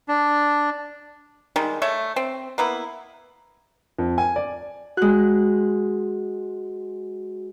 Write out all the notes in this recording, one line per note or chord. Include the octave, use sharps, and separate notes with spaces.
D4
D#3 G3 G#3
A3 C#5 E5
C4
A#3 B3 E4
F2
G#5
D5
G#3 F#4 F#6